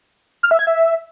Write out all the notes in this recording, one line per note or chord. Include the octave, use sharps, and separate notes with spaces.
F6
E5
G#6
E5